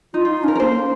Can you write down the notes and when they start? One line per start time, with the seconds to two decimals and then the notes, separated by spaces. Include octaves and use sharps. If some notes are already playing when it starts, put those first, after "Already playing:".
0.14 D#4 F4
0.25 D#4 F4
0.44 C#4 A#4
0.55 A#4
0.60 A#3 C5